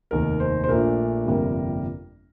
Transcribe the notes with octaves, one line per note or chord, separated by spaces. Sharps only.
F1 D#2 D#3 A#4
C5
C5
A#1 A#2 A3 D4 A#4
G1 F2 C3 G3 A#3